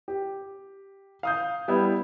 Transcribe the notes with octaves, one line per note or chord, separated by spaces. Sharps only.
G4
F5 D#6 G6
G3 B3 E4